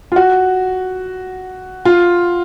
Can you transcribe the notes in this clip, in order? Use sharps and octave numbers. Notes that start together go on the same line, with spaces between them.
F4
F#4
F4